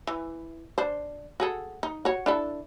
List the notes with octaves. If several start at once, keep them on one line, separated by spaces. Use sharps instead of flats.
E3
D4 C5
F#4 G#4 A4
D#4
F#4 C#5
D4 E4 A4